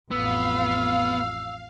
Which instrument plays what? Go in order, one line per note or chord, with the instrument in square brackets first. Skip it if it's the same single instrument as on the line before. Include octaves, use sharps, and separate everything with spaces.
[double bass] A1 F2 [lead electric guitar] B3 [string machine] F5 [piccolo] E6